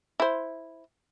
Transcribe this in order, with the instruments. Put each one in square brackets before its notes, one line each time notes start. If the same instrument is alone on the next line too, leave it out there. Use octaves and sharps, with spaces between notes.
[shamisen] E4 C5